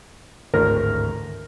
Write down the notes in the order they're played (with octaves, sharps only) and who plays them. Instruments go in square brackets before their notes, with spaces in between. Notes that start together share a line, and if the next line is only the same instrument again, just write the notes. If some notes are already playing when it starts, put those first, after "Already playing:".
[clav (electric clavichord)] G#1 D2 A2 [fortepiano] A#4